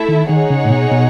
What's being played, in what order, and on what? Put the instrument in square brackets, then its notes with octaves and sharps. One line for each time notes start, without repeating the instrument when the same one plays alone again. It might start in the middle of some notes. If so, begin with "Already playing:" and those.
Already playing: [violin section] A3 E4 A4 E5
[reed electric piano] D#3
[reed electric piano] D#3 [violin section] D#4 G#4 C#5 F#5
[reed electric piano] C#3
A2
B2
B2